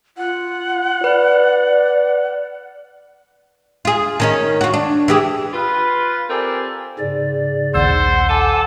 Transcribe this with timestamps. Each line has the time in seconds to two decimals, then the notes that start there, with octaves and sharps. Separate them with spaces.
0.17 F4 F#5
1.04 B4 D5
3.85 F4 G#4
4.20 D#3 C#4 D#4
4.61 F4 F#4
4.74 D4
5.08 E3 G4 G#4
5.53 F4 B4
6.30 C4 G4 A4 A#4 D5 G#5
6.99 G#2 C#3 D5
7.74 A#1 D#2 C5 F#5 E6
8.29 A4 G#5 A5 D6